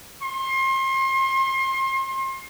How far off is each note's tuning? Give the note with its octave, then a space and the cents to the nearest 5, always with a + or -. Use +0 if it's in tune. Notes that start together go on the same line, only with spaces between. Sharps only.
C6 +35